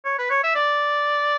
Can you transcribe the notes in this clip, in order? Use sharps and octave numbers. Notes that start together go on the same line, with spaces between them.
C#5
B4
C#5
E5
D5